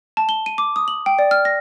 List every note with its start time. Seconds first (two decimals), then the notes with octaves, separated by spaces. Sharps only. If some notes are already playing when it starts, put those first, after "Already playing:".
0.17 A5
0.29 G7
0.46 D#7
0.58 D6
0.76 D#6
0.88 F#7
1.06 G5
1.19 D5
1.31 F6
1.45 A#6